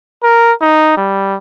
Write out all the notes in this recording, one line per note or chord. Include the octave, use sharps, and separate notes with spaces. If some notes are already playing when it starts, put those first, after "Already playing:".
A#4
D#4
G3